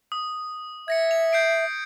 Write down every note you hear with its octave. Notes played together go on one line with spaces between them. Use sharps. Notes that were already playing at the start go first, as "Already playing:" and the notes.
D#6
E5 G#6 A#6 C#7
F7
G6 C7 D7